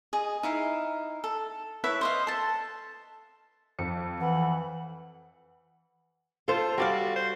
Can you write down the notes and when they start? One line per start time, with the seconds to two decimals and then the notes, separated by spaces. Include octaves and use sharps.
0.13 G#4 D#5
0.43 D#4 E4 F5
1.24 A4
1.84 E4 B4 C#5 E5
2.01 C5 D#5 F5
2.27 A4 A5
3.79 F2 C#7
4.20 E3 F#5
6.48 F4 A4 C5
6.78 G3 F#4 D5 F5
7.16 C5